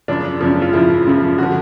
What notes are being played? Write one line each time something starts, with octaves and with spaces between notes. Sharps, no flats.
F#2 C#3 F3 D4
F#2 C#3 F3
F4
F#2 C#3 F3 E4
F#2 C#3 F3
D3 F3 F#4